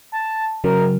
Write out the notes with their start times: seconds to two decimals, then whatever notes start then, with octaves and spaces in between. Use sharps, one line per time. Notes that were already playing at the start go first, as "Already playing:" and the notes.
0.12 A5
0.64 C#3 F#3 A#4